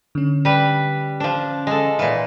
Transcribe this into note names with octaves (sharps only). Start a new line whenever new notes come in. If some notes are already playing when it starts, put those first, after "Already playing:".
D3 C#4
G3 B4
F3 D4
G#3 A4
A#2 E3 F5